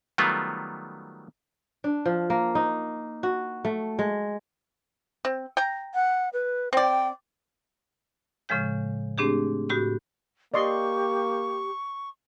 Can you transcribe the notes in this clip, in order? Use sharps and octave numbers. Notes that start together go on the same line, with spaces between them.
D#3 F#3 G3 A3 B3 F4
D4
F3
A#3
D#4
F#4
A3
G#3
C4
G5 A#5
F#5
B4
C4 D5 G5
A2 C#3 F3 G#3 G6
A3 C4 D4 G4 G#4
A2 F#4 G4 B5 G6
A#3 G4 D5 D#5 C6 C#6